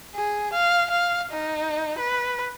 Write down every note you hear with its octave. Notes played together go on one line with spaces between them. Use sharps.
G#4
F5
F5
D#4
B4